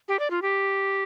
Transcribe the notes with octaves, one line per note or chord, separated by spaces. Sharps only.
G4
D5
F4
G4